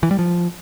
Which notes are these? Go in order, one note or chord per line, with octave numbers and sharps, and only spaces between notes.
E3
G3
F3